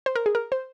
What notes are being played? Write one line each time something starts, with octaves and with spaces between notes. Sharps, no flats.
C5
A#4
G#4
A#4
C5